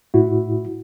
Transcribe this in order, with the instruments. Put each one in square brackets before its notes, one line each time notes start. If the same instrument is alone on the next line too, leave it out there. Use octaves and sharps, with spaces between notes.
[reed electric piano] A2 E4 F#4